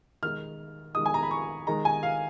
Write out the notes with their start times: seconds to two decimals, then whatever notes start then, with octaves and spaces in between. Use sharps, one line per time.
0.23 D#3 G#3 D#4 F6
0.95 D#3 G#3 D#4 D#6
1.06 G#5
1.14 A#5
1.23 B5
1.31 C#6
1.67 D#3 G#3 D#4 A#5
1.85 G#5
2.03 F5